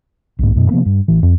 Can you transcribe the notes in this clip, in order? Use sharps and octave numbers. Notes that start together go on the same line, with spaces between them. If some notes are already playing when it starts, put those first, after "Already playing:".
B1 G#2
F#2 B2
C3 F3 A#3 B3
G2
A1 E3
F2